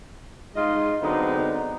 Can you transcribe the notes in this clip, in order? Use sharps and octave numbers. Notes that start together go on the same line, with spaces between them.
G#3 D#4 F4 D#5
D3 F#3 G#3 B3 C4 D#4